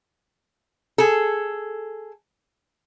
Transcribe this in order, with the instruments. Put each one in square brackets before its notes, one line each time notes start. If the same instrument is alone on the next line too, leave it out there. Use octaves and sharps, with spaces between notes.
[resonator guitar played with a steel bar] G#4 A4